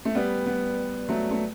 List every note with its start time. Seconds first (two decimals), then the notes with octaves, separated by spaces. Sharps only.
0.05 A3
0.15 G3 B3
0.46 G3 B3
1.09 F#3 A3
1.31 A3